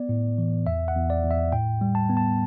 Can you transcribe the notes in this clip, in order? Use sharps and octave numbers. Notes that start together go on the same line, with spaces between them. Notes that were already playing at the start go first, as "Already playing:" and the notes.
Already playing: B3 D5
A2
E3
E2 E5
F#5
E2
D5
E2
E5
A2 G5
G3
A5
B3
A5